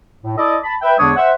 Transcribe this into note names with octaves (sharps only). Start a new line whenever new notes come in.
A2
E4 A4 D5 D#5
A5 B5
B4 E5 G5
E2 D3 G#3 D4 C#5 D#6
C5 E5 F#5